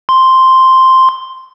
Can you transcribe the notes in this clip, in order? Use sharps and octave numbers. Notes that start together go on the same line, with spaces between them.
C6